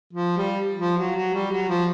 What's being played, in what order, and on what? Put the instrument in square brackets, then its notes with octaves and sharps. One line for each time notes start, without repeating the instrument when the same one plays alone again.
[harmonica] F3
G3
F3
F#3
F#3
G3
F#3
F3